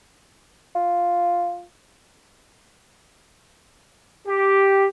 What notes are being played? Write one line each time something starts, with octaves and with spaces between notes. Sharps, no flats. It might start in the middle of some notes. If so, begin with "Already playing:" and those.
F4
G4